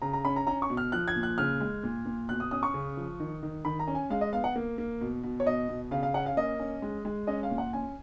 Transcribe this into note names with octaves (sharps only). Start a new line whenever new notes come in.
C#3 A#5
A#5
C#4 B5
A#5
C#4 A#5
C#6
B2
F6
F3 F#6
G#6
A#2
F#6
C#3 F6
G#3
A#2
A#2
B2 F#6
D#6
C#4 D#6
C#6
C#3
F3
D#3
D#3
D#3 B5
A#5
C#4
G#5
G#3 F5
D#5
B3 F5
F#5
A#3
A#3
B2
B2
C#5
B2 D#5
B2
C#3 F5
F5
C#4 F#5
F5
A#3 D#5
C#4
G#3
G#3
C#4 D#5
F5
A#2
F#5
C#4 G#5